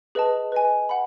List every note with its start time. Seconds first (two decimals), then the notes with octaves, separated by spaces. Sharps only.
0.15 G#4 B4 D#5 A5
0.52 B4 D#5 G#5
0.89 F#5 B5